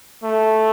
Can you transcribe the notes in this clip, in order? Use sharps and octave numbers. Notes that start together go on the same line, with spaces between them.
A3